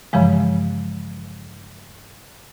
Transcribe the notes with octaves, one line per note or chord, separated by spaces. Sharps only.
G2 C#3 E3 F3 G#3